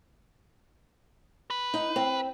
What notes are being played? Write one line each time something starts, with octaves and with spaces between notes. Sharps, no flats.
B4
D#4
C4